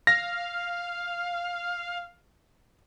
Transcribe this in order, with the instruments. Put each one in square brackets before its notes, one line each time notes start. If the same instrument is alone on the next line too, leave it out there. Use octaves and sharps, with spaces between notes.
[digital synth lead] F5 [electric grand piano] A#6